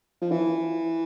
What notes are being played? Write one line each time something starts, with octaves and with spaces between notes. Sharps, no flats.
F3
E3